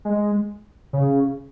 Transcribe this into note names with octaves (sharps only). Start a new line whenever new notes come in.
G#3
C#3